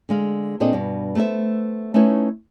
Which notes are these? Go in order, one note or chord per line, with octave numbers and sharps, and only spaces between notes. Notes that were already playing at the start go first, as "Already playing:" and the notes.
D3 G#3 F5
A#2 C4 D4 G#4 A4 D#5
G2 B2
A3 B3 A4 C5 E5
A3 C#4 D#4 E4 B4 C#5